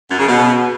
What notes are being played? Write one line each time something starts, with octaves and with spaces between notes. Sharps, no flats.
F#2
C#3
B2